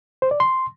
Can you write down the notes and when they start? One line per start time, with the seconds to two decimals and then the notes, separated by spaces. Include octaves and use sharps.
0.22 C5
0.31 D5
0.40 C6